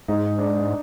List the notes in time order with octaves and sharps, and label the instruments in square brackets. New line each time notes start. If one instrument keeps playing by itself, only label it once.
[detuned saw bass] G#2 [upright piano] D#4
[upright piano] D4